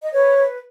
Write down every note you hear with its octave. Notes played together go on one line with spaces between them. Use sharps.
D#5
B4 C#5
B4